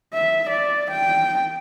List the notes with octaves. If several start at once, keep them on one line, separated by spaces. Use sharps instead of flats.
E5
D5
G5